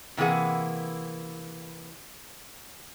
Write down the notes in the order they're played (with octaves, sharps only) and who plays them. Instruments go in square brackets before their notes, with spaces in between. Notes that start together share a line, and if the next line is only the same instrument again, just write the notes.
[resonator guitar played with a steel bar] C3 E3 A#3 G#4 F#5